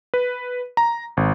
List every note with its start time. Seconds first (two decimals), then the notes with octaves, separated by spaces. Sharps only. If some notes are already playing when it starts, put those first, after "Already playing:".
0.14 B4
0.77 A#5
1.17 G#1